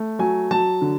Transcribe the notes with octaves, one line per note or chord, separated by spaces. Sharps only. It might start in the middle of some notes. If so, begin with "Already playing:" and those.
Already playing: A3
F#3 G#5
F#3 A5
D3